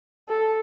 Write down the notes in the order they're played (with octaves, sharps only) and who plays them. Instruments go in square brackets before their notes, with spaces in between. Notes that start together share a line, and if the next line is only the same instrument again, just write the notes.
[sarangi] A4